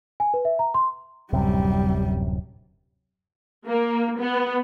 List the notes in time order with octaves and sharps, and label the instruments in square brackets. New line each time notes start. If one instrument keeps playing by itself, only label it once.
[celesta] G#5
B4
E5
A#5
C6
[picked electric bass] D1 F#2 C3 [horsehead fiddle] G3
[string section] A#3
B3